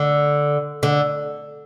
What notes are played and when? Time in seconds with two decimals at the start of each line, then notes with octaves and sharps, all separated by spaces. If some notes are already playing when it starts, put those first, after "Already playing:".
Already playing: D3
0.83 D3